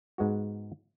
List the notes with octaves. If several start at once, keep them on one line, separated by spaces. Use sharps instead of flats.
G#2 G#3 B3 F#4